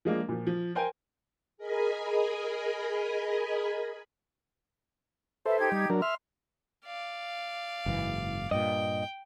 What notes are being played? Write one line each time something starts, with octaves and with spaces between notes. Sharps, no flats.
F3 G#3 A#3 D4
A#2 F3
F3
A#4 C5 G5 G#5
G#4 A#4 D#5 G#5 B5
A4 B4 C5 E5
D#4 G4 G#6
G3
F#3 D4 A#4
E5 C6 F6
D5 F5
F#1 G#2 E3
G2 A#2 D#5 G5